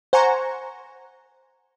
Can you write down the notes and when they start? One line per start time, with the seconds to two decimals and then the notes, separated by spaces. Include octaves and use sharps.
0.13 C5 F#5 G#5 A#5 C#6